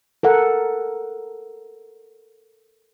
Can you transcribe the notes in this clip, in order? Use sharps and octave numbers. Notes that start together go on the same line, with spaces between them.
A4 A#4 F#5